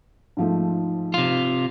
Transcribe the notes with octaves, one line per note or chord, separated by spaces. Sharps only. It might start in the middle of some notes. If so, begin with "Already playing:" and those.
G#2 F3 A3
C3 F4